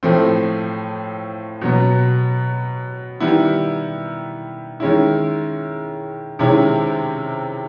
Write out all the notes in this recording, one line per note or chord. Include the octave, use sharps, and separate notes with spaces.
A2 F3 A3 C4
B2 F#3 B3
D#3 G3 B3 E4
D#3 G#3 C#4 E4
C3 D#3 G#3 C#4 E4